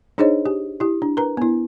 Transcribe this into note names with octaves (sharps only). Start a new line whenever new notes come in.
D4 D#4 G#4 C5 C#5 D#5
G4
E4 G4
D4
A#4 B4 A#5
B3 E4